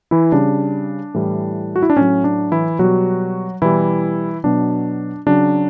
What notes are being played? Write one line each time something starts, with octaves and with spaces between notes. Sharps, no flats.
E3 E4
C#3 G3 D4
A2 E3 G3
F#4
E4
D4
A2 F#3 C#4
D4
E3 E4
B2 F#3 G3 F#4
B2 E3 G3 E4
B2 F#3 D4
C#3 F#3 D4